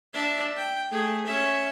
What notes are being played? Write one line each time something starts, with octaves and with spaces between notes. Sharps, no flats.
D4 E5
G5
A3 G#4
C#4 E5